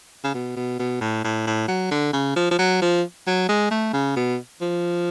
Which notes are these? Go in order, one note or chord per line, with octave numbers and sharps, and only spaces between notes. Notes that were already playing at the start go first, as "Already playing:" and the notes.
C#3
B2
B2
B2
A2
A2
A2
F#3
D3
C#3
F3
F3
F#3
F3
F#3
G#3
A3
C#3
B2
F3